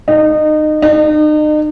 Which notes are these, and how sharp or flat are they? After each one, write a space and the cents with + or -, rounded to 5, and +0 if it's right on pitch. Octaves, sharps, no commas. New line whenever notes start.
D#4 -25
D#4 -40